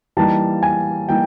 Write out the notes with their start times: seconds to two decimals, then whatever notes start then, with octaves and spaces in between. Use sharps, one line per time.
0.17 E3 G3 A#3 D#4 A5
0.63 G#5
1.09 E3 G3 A#3 D#4 G5